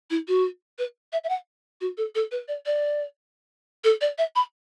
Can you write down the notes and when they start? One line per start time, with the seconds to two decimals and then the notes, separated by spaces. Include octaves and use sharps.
0.10 E4
0.28 F#4
0.78 B4
1.12 E5
1.24 E5
1.29 F#5
1.81 F#4
1.97 A4
2.15 A4
2.31 B4
2.48 D5
2.66 D5
3.84 A4
4.01 D5
4.18 E5
4.35 B5